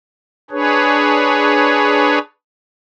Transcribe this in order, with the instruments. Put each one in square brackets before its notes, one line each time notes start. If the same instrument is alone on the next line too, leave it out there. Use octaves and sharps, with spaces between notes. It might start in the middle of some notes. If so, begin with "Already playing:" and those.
[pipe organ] D4 G#4 B4 C#5